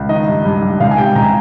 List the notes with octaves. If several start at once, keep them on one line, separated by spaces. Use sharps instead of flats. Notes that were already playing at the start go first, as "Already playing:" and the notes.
Already playing: C#2
D#3 D#5
G2
G2
G2
C#2 F5
G#5
C3 G5
C#2 A#5